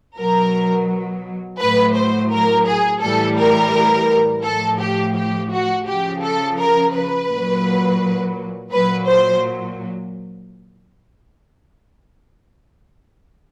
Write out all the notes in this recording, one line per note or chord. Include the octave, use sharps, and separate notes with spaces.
B2 F#3 A#4
A2 F#3 B4
C5
A#4
G#4
A2 E3 G3 A4
A#4
A2 F3 A4
G4
G4
F#4
C#3 F3 G4
A4
A#4
B4
A#2 F#3
A#2 F#3 B4
C5